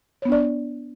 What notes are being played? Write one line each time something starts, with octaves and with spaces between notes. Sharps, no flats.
B3 D4 C#5 D5